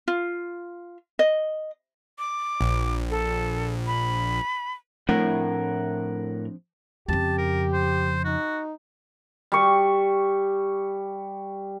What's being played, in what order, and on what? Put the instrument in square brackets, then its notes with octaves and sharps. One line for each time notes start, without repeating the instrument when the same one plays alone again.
[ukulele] F4
D#5
[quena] D6
[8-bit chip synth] A#1
[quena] A4
B5
[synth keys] A2 [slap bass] F3 C4 D4 [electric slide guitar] A#4 F#5
[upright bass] F2 C#3 [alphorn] G4 [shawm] A5
[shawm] A#4
C5
[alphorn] D#4 [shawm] F#4
[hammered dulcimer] G3 C#6